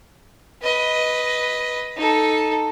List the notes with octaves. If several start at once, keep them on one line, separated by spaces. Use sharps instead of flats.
B4 D#5
D#4 A4